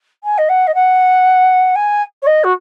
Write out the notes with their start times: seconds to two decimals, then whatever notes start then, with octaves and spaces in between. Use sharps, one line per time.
0.24 G#5
0.38 D#5
0.49 F#5
0.67 D#5
0.74 F#5
1.75 G#5
2.22 C#5
2.26 D#5
2.44 F#4